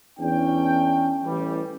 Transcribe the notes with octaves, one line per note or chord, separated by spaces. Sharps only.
E2 C#4 D4 G5
A1 E3 G3